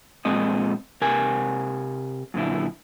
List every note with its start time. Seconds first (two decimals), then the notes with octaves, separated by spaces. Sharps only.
0.25 A#2 G#3 C4 D#5
1.01 C3 A#4 G#5
2.34 F#2 A#2 D3 E4